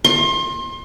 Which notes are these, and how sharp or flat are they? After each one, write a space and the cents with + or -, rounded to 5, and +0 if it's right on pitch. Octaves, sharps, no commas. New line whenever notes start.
C6 +30